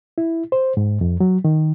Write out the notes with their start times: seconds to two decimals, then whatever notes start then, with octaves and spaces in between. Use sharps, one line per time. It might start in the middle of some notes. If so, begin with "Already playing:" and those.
0.18 E4
0.52 C5
0.77 G#2
1.01 F2
1.20 F#3
1.45 D#3